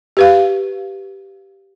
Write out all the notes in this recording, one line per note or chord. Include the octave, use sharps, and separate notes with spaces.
G4 B4 F5